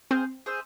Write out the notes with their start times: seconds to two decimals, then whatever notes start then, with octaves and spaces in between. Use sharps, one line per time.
0.11 C4 G#4 C5 F5
0.46 G#4 C5 E5